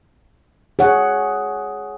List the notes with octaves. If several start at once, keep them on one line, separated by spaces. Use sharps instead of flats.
G#4 C#5 F#5